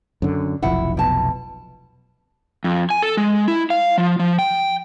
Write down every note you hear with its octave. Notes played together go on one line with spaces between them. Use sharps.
F#2 D3
F1 B1 F3 E4 F#5
B2 A5
F2
G#5
A4
G#3
E4
F5
F3
F3
G5